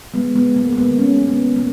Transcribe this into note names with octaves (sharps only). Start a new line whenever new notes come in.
G#3 B3
G#3 B3
G#3 A#3
A#3
D#3 B3
G#3 C#4
D#3
B3
D#3
A#3